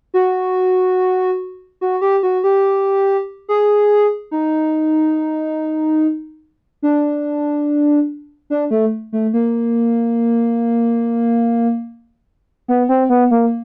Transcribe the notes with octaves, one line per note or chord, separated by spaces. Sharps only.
F#4
F#4
G4
F#4
G4
G#4
D#4
D4
D4
A3
A3
A#3
B3
C4
B3
A#3